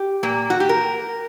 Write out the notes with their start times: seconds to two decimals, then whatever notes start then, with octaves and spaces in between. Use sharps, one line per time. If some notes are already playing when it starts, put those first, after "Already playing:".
Already playing: G4
0.23 A#2 A#3
0.50 F#4
0.60 G4
0.69 A#4